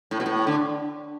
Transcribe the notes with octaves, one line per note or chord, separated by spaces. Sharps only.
A2
B2
A2
D3